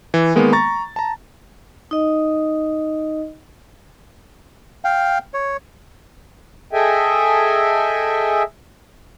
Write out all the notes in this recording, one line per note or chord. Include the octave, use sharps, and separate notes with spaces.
E3
D#3 G#3 A#3 B3
A#5 C#6 A6
A5 A#5
D#4 D#5
F5 G5
C#5
G#4 A4 D#5 E5 G5 G#5